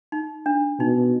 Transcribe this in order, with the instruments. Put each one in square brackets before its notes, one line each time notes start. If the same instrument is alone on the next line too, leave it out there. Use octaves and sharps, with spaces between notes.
[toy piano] D#4
D4
[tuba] B2 [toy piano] D#4